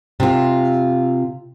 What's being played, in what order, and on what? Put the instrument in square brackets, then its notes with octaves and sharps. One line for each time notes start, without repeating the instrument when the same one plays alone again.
[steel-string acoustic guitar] C3 F4